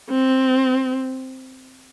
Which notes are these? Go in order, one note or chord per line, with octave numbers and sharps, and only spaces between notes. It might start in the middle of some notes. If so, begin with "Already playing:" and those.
C4